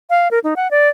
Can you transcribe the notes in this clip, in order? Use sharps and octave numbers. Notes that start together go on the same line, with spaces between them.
F5
A#4
D#4
F#5
D5